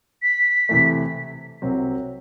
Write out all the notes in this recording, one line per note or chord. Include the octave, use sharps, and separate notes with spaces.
B6
C3 E3 A3
C2 C3 F#3 C4